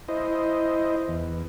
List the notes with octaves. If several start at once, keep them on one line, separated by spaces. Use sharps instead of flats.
E4 C5 D#5
E2